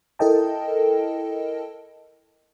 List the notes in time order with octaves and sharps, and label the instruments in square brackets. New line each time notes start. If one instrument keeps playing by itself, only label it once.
[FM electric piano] E4 A4 A#4 D#5 G5 A5